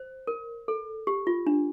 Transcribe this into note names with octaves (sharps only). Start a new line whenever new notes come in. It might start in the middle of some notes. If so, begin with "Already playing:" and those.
Already playing: C5
A#4
A4
G4
F4
D4